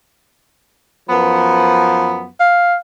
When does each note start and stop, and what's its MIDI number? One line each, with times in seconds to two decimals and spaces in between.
1.08 2.26 42
1.08 2.26 53
1.08 2.26 59
2.40 2.77 77